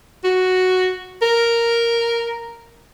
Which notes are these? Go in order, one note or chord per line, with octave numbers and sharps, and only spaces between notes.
F#4
A#4